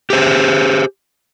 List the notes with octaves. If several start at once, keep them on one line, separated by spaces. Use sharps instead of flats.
G4 G#4 C5